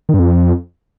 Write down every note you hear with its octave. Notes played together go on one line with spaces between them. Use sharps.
D#3
G2
F2